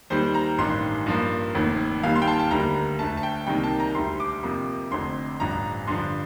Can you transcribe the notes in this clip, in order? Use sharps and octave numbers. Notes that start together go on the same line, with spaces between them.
D#2 D#3 G3 C5
A#5
A1 G2 D#3 C6
G2 F3 A#3
F1 D#2 D#3
D#2 D#3 G3 F5
C6
G5
A5
A5
D2 D3 G3 A#3 A#5
D2 D3 A3 A5
A5
G5
C2 C3 D#3 A#3 G5
A5
A#5
D2 D3 G3 C6
D6
F2 C3 F3 A#3
F1 F2 D3 C6
A1 G2 F3 A#5
G2 D3 F3 C6